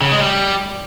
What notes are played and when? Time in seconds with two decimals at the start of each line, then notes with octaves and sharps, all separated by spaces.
0.01 C#3
0.12 G#3
0.22 G3